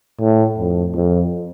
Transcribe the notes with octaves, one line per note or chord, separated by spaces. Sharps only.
A2
F2
F2